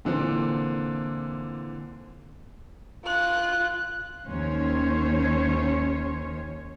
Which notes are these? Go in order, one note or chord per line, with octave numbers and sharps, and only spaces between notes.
A#2 D3 E3 C4
F4 F#6
D#2 D#3 C#4 C5 C#5